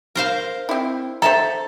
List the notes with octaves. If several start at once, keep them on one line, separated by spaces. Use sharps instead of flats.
A#4 C5 F5
C4 E4
A4 C5 E5 A#5